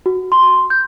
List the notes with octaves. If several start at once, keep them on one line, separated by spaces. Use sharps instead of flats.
F#4
C6
G6